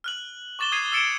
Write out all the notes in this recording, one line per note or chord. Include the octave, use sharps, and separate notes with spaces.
F6 F#6 F#7
C#6 D6 A6 E7 G7
D#6 G#6 C7 D#7
E6 A6 C#7 D7 E7